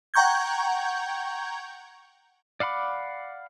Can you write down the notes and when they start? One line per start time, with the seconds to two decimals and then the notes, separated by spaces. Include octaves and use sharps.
0.14 F#5 G5 A#5 C#6 G6 G#6
2.60 D5 F5 F#5 B5 D6